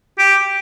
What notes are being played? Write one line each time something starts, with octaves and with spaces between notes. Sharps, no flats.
G4